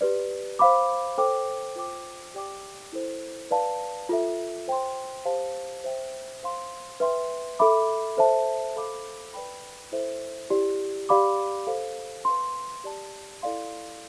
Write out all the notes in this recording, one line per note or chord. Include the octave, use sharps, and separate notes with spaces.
G4 B4 D5
C5 F5 B5 D6
A4 C5 G5 D6
F4 C5 G5 D6
G4 D5 G5 D6
E4 A4 C5
B4 D5 F5 A5
F4 A4 E5
C5 G5 C6
G4 C5 F5 A5
C5 E5 G5
C5 F5 C6
B4 E5 G5 C6
A4 E5 B5 D6
A4 C5 E5 A5
A4 C5 F5 B5 D6
B4 D5 G5 B5
E4 A4 C5 E5
E4 G4 D5
G4 D5 F5 B5 D6
A4 C5 F5
B4 F5 C6
G4 D5 A5
E4 A4 D5 F5 C6